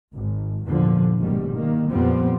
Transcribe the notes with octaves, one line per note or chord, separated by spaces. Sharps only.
G#1 G#2
E2 G2 A#2 D3 F3
F#1 G#2 B2 D#3 G3
D#3 A#3
F2 A#2 F3 G3 B3 C4